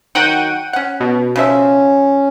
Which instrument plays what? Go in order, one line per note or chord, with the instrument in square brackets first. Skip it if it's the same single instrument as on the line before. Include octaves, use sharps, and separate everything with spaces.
[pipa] D#3 F#3 F#4 [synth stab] F#5 G5 D#7
[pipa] C#4 F#5
[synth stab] B2
[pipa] C#3 F3 E5 [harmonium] C#4